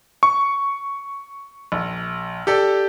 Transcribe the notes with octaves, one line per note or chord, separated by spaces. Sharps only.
C#6
A#1
G4 A4 D5